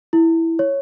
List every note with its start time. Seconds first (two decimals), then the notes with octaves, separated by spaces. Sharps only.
0.13 E4
0.59 C#5